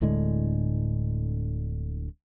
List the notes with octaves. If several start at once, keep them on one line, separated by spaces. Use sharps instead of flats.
D1 A2 D3 G#3